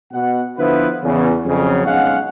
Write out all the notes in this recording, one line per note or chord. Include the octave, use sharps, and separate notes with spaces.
B2 F#5
D3 F3 B3 E4 B4
E2 C#3
F2 C#3 F#3
B1 G#3 C#4 F5 F#5